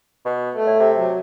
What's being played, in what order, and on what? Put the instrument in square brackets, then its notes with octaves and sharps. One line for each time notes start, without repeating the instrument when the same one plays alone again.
[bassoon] B2
[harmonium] A3
[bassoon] A2
C3
[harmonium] F#3